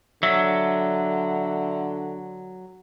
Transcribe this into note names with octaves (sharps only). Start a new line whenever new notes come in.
D3 F#3 E5